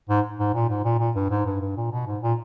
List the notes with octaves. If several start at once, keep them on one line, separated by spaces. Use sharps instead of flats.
G#2
G#2
A#2
G#2
A#2
A#2
G2
G#2
G2
G2
A#2
B2
G#2
A#2